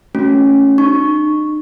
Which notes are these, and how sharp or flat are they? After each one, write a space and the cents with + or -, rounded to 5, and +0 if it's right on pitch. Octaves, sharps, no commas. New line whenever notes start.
A3 +0 C#4 +0 F#4 +0
D#4 -40 C#6 +0